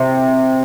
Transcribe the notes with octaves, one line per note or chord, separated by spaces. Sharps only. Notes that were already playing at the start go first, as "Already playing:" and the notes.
Already playing: C3